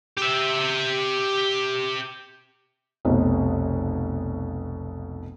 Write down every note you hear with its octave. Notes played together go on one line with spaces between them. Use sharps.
G4 E5
F1 B1 B2